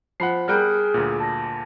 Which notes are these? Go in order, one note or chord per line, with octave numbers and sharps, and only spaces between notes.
F3 C5 F#5 B5 C7
G3 G#4 A#4 G5 F6 F#6
D2 A#2
A5 A#6